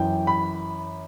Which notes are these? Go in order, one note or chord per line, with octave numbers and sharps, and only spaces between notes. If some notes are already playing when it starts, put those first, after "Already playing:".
Already playing: F#2 E3 G5
B5